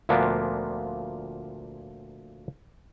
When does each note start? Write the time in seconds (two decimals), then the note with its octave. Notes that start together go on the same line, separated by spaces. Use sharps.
0.09 D2 A#2 F3 A#3 B3 D4